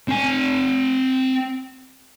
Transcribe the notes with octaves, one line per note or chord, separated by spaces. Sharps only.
C4 G#5